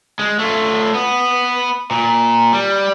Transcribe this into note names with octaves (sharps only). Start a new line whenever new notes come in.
G#3
A3 F4
B3
A#2
G3